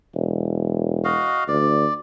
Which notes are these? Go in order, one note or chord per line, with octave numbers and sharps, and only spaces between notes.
E1
F#4 D#5 F5
D2 D5